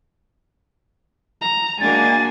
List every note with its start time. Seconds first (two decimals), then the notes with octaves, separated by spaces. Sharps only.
1.41 A#5
1.80 G#3 A#3 D4 F#4 G#5 A6